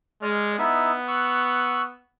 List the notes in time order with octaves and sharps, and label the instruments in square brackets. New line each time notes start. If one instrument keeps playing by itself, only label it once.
[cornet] G#3 [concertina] D5 F6
[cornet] B3 [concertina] D#4 E4 E5
[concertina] C#6 E6 F#6